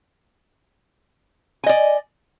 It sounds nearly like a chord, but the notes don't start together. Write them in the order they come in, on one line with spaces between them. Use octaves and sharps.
G#5 D#5 D5